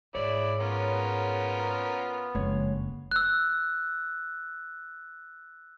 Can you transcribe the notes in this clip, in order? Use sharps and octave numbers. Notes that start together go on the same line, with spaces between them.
G#2 E4 G#4 C#5 D5
B3 C#4 F4 A#4
F#1 F2 G#3 C#5
E6 F#6